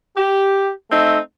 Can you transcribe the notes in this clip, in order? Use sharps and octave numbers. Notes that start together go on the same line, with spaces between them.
G4
A3 C4 D#4 E5